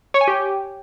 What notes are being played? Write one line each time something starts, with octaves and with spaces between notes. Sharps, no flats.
C#5
G#5
G4